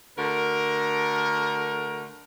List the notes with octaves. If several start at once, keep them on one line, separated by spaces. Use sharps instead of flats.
D3 A3 F#4 A#4